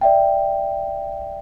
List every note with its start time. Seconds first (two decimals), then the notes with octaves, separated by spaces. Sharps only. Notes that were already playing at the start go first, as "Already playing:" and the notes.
0.01 D5 E5 G5